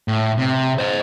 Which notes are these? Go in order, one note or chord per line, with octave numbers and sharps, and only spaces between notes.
A2
C3
C5 D#5